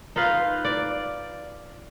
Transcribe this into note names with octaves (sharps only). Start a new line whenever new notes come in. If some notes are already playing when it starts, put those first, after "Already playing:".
D#4 F4 B4 F5
D5